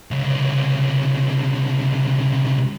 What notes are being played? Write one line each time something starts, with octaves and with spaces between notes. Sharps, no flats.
C2 C#3